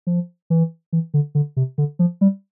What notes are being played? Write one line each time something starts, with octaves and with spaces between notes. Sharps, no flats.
F3
E3
E3
D3
D3
C3
D3
F3
G3